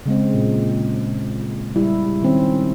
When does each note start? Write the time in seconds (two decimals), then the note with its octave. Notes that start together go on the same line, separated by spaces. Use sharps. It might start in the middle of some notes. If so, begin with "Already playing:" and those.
0.06 C#3 G#3 C4
0.34 A#2
1.76 G3 E4
2.22 D#3 C4 C#4